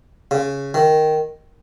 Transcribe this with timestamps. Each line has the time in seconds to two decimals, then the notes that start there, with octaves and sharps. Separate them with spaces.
0.31 C#3
0.74 D#3